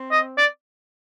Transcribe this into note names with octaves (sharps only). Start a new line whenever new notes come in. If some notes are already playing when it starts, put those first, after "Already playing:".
Already playing: C4
D#5
D5